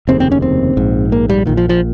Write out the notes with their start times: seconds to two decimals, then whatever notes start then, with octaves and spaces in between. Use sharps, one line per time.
0.08 F1 D#2 C#3 C4
0.20 C4
0.32 C#4
0.42 C4
0.77 A#1 G#2
1.12 A#3
1.30 G3
1.46 A#1 A#2 D#3
1.57 F3
1.69 F3